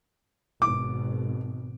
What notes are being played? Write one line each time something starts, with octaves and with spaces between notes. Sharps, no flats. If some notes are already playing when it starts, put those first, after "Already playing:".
G#1 B2 D6